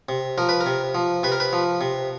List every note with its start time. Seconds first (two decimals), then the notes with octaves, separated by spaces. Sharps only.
0.09 C3
0.38 F3 A#4
0.49 B4
0.61 A#4
0.66 C3
0.95 F3
1.23 C3 B4
1.32 A#4
1.40 B4
1.53 F3
1.81 C3